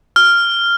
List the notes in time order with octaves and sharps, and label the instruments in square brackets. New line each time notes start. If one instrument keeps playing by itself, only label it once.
[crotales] F6